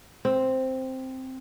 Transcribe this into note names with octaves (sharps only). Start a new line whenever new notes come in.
C4